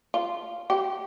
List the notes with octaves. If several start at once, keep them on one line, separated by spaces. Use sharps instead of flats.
F4
G4